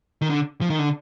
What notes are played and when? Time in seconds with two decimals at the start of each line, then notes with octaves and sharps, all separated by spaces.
0.22 D#3
0.30 D3
0.61 F3
0.70 D#3
0.79 D3